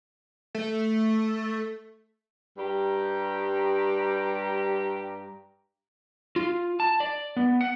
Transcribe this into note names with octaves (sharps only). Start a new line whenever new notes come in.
A3
G2 G3 G4 A#5
F4
A5
D5
B3
F#5